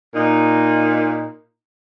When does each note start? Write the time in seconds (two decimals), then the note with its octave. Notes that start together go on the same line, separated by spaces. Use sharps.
0.15 A#2 D#4